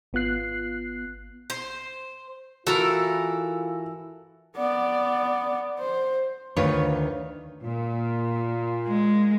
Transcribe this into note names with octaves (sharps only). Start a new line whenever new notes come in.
G#1 B3 F4 F#6 C7
C5
E3 F4 F#4 A4 A#4 A#5
B3 D5
C5
D2 D#3 D4 F4 B4 C#5
A#2 F4
G#3